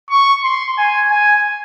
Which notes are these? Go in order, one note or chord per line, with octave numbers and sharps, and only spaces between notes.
C#6
C6
G#5
G#5